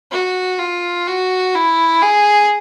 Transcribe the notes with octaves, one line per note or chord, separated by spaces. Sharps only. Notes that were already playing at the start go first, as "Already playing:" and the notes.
F#4
F4
F#4
E4
G#4